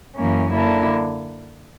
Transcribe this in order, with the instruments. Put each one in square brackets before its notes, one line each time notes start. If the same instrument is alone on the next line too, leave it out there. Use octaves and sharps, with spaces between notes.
[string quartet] F#2 E3 A#3 C#4
D3 A#3 E4